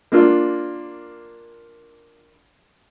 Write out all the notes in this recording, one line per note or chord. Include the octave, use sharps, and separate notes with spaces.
A#3 D4 F4